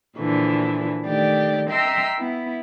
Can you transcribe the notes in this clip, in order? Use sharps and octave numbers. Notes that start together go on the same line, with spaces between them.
A#2 D3 E3 F3
D#3 A3 G4 D5
D#5 E5 G5 A#5 C6 E6
B3 E4